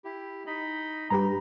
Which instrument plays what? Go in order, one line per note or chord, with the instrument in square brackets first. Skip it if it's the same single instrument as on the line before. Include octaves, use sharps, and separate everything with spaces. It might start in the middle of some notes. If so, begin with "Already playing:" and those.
[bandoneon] E4 G4
D#4 D#5 B5
[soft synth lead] G2 [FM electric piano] G4 B4 A#5